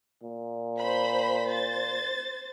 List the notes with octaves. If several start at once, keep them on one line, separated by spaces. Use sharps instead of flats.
A#2
C5 B5 B6
C5 A6